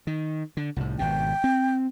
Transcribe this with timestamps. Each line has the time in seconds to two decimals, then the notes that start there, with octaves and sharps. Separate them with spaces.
0.07 D#3
0.57 D3
0.76 C2 A2
0.99 G#1 B2 G5
1.44 C4